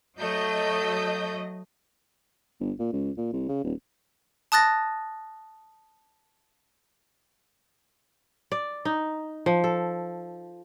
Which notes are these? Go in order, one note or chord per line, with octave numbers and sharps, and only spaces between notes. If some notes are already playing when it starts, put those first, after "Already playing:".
F#3 A3 D#5 G6
G1
A#2
C#2
A#2
C2
C#3
D#1
A5 D#6 F#6 A6 A#6
D5
D#4
F3
A4